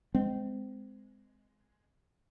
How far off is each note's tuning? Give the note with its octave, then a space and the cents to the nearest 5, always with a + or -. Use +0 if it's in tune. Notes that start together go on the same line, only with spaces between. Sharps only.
G#3 +0 C4 -25